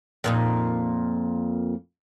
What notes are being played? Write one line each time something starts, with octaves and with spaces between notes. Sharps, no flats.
F2 A#2 D#4